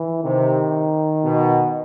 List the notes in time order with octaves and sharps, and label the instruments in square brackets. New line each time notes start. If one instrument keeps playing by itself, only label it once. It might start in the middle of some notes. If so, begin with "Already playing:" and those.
Already playing: [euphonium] E3
[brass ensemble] C3 [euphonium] D#3
[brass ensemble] B2